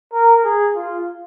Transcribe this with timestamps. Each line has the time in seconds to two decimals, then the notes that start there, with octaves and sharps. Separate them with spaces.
0.13 A#4
0.45 G#4
0.76 F4